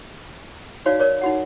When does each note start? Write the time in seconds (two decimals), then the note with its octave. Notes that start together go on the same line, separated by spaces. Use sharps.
0.86 D#4 F#4 C#5 D5 F5
1.00 A#4 C#5 D5
1.21 D#4 F#4 F#5